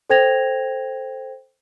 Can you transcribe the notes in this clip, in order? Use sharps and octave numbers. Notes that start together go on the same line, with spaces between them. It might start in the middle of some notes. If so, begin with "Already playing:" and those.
A4 C5 G5 G#6 A#6 F7